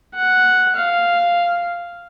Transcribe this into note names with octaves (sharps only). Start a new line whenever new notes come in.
F#5
F5